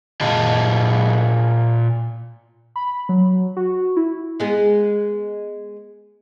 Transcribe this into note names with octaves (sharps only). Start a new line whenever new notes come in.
A#2 F4 G#4 D#5 A5
B5
F#3
F#4
E4
G#3 B3 G#4